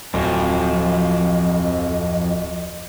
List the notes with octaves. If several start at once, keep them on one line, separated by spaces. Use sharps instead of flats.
D1 F2 D#5